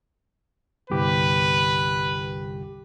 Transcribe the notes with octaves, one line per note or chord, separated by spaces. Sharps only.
G1 C2 G4 B4